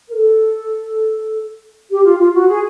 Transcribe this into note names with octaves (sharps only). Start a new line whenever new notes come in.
A#4
A4
G4
F4
F4
F#4
G#4